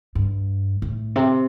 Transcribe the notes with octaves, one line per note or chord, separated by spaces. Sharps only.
G2
A2
C3